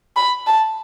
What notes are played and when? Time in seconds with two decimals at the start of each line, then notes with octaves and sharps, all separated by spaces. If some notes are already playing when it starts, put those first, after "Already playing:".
0.16 B5
0.47 A5